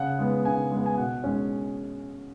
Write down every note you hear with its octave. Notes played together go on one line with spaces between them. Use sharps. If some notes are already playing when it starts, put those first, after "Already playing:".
Already playing: C#3 F#5
G#3 B3
C#3 G#5
G#3 B3
G#5
B2 F#5
G#3 C#4